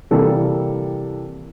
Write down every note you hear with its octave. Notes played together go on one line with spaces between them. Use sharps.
C3 E3 G3 A#3 A4